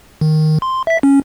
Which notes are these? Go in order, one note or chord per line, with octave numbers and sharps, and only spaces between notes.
D#3
C6
E5 B6
C#4